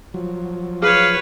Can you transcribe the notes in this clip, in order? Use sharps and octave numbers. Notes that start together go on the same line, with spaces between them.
F3 F#3
G#4 B4 C#5 F5